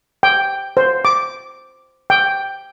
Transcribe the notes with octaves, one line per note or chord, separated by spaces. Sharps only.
G5
C5
D6
G5